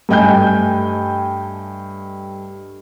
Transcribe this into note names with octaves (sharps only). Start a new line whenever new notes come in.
G2 A3 D#5 G5 G#5 G6